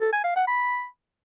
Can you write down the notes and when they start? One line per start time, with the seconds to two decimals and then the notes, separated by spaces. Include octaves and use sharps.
0.01 A4
0.12 G#5
0.24 F5
0.36 F#5
0.47 B5